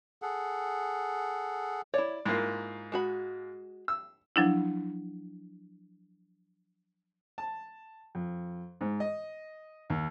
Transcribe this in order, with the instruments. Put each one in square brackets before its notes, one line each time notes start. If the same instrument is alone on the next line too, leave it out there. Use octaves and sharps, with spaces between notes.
[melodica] G#4 A4 F#5
[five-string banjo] E4 C#5 [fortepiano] D5
[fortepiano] G#2 A#3 [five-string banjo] E4 F4
[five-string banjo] G#3 F#4 B5
[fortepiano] E6
[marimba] F3 F#3 D4 E4
[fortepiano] A5
F2
G#2
D#5
D#2